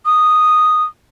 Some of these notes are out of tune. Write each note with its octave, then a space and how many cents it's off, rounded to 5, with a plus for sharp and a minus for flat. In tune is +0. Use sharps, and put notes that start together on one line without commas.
D#6 -5